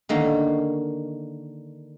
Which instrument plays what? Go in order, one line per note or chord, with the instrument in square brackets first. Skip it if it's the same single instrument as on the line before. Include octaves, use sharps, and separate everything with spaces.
[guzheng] D3 D#3 A#3 C#4